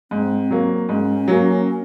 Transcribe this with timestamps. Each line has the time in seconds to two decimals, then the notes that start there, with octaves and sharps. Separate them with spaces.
0.11 G#2 C4
0.51 F#3 A#3
0.88 G#2 C#4
1.28 F#3 A#3